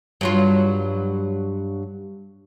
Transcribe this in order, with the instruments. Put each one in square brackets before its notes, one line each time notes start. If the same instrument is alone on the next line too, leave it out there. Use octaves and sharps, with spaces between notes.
[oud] G2 F#3 F4